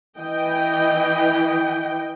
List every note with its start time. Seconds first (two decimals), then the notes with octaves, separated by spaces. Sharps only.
0.17 E3 D#5 G5